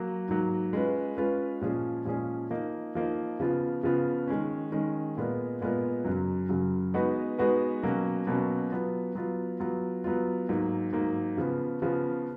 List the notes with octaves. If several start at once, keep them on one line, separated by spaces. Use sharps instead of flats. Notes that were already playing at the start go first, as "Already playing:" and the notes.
Already playing: F#3 A#3
G#2 F#3 A#3
G#3 C#4 F4 B4
G#3 C#4 F4 B4
A#2 F3 G#3 C#4 G#4
A#2 F3 G#3 C#4 G#4
F3 A#3 D#4
F3 A#3 D#4
C#3 F3 B3 F4
C#3 F3 B3 F4
D#3 G#3 C#4
D#3 G#3 C#4
A#2 G#3 B3 F4 A#4
A#2 G#3 B3 F4 A#4
F#2 C#3 F#3
F#2 C#3 F#3
G#3 B3 D#4 F#4 B4
G#3 B3 D#4 F#4 B4
B2 F#3 A#3 C#4
B2 F#3 A#3 C#4
F#3 B3 F4
F#3 B3 F4
F#3 B3 F4
F#3 B3 F4
G#2 F#3 A#3
G#2 F#3 A#3
C#3 F3 B3
C#3 F3 B3